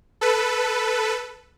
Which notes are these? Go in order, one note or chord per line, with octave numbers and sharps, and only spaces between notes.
A4 B4